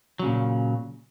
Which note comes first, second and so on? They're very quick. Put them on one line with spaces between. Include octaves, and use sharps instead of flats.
F#3 C#3 A#2